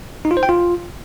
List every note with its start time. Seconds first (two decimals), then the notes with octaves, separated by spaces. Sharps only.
0.25 D#4
0.31 F4
0.37 C5
0.43 G5
0.49 F4